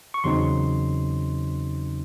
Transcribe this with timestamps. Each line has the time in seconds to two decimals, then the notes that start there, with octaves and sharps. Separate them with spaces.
0.14 C#6
0.24 E2 C#3 F#3 C4 D#4 C6